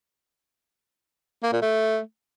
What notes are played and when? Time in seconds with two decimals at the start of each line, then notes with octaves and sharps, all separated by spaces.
1.43 A#3
1.53 A#2
1.62 A3